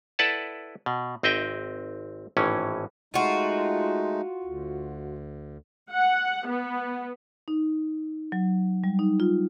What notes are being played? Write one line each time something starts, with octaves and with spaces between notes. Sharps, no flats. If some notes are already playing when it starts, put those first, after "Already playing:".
E4 A4 B4 D5 F#5 A5
B2
G#1 C4 D#5 E5 G5
G#1 A2 E3 C#4
G#3 A3 D#4 F4 F#4
D2
F#5
B3
D#4
F#3
G3
D#4
F4